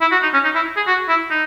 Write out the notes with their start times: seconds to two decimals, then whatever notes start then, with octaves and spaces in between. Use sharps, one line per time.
0.01 E4
0.12 F#4
0.23 D#4
0.34 C#4
0.44 D#4
0.55 E4
0.77 G#4
0.87 F#4
1.09 E4
1.30 D#4